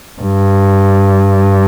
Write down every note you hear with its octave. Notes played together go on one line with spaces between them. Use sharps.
G2